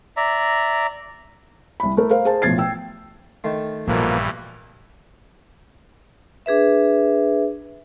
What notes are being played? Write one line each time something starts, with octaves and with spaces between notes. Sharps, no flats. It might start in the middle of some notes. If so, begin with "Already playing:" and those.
D5 E5 A#5
C2 B5
A3 A#4
A#4 C5 F5
G#4 C5 A5
A1 B2 F3 G#6 A6 C7
G5 E6
D#3 A3 C6
A#1 G2 B2 E3 F3 A#3
D4 G#4 B4 E5